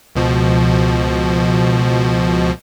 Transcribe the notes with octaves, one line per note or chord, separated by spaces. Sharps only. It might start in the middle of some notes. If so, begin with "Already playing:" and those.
C#2 B2 F3